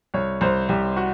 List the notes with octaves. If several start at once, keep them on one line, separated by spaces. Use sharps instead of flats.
C2 C#5
C2 C5
C2 G4
F#4